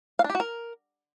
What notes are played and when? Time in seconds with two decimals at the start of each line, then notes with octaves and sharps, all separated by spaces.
0.19 F5
0.24 D4
0.30 G4
0.35 F#4
0.40 A#4